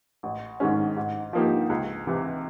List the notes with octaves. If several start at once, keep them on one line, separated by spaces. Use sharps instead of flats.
A1
G#2 D#3 G#3 C#4
G#2
F3 A#3 D#4 G4
C#2
C3 E3